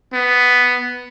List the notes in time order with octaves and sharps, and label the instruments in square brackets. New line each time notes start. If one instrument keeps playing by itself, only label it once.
[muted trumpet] B3